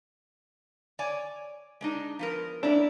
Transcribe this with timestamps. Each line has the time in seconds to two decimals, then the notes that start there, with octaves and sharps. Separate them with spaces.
0.99 C#5 D5 G#5
1.81 G#3 D4 D#4
2.19 F3 B3 A#4
2.63 A#3 D4 E4